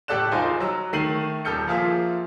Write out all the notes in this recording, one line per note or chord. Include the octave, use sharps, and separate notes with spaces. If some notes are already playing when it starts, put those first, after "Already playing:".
A2 G4 A4 D5 F#6 E7
E1 D#4 F4 C5 G#5
F#3 E6
D#3 A3 C7 D#7 F#7
D#1 A4 F6 G6 C#7
F3 A#3 F4 G#4 E5